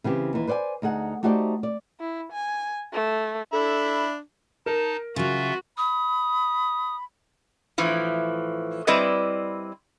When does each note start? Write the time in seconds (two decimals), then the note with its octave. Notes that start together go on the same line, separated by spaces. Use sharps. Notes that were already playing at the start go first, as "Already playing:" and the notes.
0.04 C#3 E3 C4 G4
0.33 D#2 E3
0.47 B4 C5 D5 E5 G#5
0.82 D2 D#4 G#4 F#5
1.23 A3 D#4 F#4 G4 C5 D5
1.63 D5
2.00 E4
2.32 G#5
2.93 A3
3.53 D4 A4 E5 B5
4.66 D#4 A#4 A5
5.16 C#3 F#3 F4 F#4 E5
5.78 B5 D#6
7.78 A2 E3 F3
8.87 G3 C4 E4 B4 D5 D#5